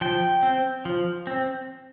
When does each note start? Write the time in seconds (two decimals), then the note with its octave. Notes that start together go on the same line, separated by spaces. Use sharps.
0.01 F3 G5
0.43 C4
0.85 F3
1.27 C4